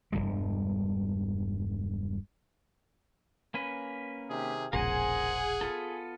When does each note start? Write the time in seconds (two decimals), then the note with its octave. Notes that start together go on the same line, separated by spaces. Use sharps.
0.12 E1 E2 G2 G3
3.54 A#3 C#4 B4
4.29 C3 D#3 G#4
4.73 E1 A#1 C#3 G#4 A#4 C5 F#5 G#5
5.61 B3 F4 A4